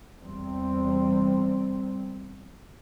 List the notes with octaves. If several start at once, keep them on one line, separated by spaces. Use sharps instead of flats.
E2 C3 G3 C4